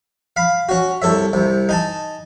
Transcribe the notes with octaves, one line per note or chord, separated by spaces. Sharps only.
F5 B5
C#4 F#4
C2 A4 C#5 E5
C2 C3
D#4 G#5 A5